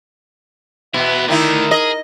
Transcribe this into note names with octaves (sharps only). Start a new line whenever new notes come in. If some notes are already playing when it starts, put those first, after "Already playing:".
B2 B3 E4 E5
D3 D#3 A3 D#4 E4 A#4
G#4 D#5